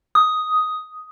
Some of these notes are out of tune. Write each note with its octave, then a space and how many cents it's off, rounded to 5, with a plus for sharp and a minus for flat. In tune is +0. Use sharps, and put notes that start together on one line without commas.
D#6 +5